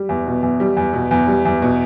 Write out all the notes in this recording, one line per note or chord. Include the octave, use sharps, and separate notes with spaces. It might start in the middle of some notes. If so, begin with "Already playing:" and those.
Already playing: G3
E2
B2
E2
G3
E2
B2
E2
G3
E2
B2